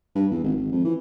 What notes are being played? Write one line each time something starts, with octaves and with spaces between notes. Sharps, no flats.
G2
E2
G#1
G#1
F2
E3